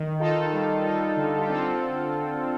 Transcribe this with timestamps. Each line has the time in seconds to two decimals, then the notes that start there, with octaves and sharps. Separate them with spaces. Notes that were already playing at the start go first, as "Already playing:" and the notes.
Already playing: D#3
0.20 D#4 F4 A4
0.53 G3
0.85 D#4
1.17 D3
1.38 G4
1.49 C4 F4 A4